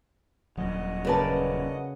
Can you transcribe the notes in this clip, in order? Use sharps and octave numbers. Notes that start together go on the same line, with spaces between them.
D#1 F#3 F#4 D#5 F#5
C#3 A#4 B4 D5 A5